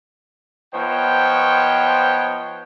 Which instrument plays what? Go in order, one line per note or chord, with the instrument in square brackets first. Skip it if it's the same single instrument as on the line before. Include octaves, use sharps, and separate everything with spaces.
[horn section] F3 B3 D#4 C5 C#5 G5